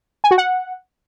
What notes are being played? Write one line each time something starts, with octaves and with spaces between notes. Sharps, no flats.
G#5
F#4
F#5